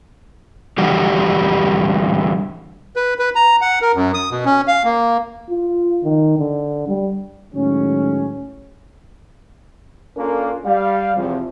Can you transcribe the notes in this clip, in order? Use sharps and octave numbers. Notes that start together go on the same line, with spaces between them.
D3 E3 G3 F#4 G4
B4
B4
A#5
F#5
A#4
F#2
D#6
B2
C#4
F5
A#3
F4
D#3
D3
G3
A2 D#3 F#3 G#3 C#4
A#3 C#4 D4 F4 A4 A#4
G3 F5
E2 C3 F3